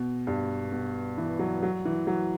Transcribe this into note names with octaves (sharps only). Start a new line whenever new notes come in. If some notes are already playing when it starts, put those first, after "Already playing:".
Already playing: B2
G2
B2
E3
F#3
F#3
E3
F#3